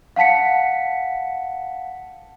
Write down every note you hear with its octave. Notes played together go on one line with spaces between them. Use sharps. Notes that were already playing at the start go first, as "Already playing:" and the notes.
F5 F#5 A5 B6 C#7